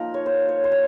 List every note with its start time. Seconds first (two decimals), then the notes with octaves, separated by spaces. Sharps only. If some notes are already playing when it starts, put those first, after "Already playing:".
Already playing: F3 A#3 D#4 A#4
0.14 C#5
0.26 C5
0.49 C#5
0.64 C5
0.72 C#5